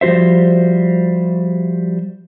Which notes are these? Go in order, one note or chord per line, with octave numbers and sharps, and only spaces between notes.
F3 G3 F#4 C5 E5